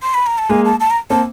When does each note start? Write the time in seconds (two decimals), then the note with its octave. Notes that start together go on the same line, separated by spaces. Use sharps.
0.02 C6
0.14 B5
0.26 A#5
0.38 A5
0.49 G#3 A#3 G#5
0.65 A5
0.80 A5
0.90 A#5
1.10 A#3 C4 A5